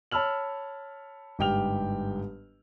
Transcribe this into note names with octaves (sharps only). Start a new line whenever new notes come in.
C#5 A5 B5 E6 F6 F#7
G1 G#2 G4 G5 F6 F7